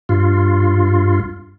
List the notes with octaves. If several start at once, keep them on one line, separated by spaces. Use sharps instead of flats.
G2 F4